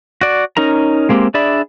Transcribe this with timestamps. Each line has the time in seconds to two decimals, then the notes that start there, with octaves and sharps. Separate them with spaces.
0.21 F#4 D5
0.57 C#4 D#4 A#4 A#5
1.09 G#3 A#3 C4 G4
1.34 D4 G#4 D5 E5 B5